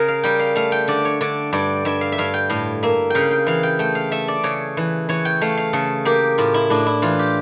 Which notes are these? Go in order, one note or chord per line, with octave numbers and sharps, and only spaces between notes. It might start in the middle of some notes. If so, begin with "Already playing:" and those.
Already playing: C#3 A#4
F5
G3 G5
F5
A3 F5
G5
D3 D5
C#5
D3 D5
G2 D5
G2 E5
F5
E5
G2 F5
G5
A2 F5
A#3 E5
C#3 F5 G5
G5
E3 F5
G5
A3 G5
F5
A3 E5
D5
C#3 C#5
E3
E3 C#5
G5
A3 F5
F5
C#3 A4
A#3 G4
A2 F4
E4
A2 D4
E4
E3 F4
G4